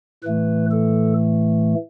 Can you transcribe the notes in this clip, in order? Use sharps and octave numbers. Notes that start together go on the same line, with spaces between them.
A2 E3 A3 B4
A4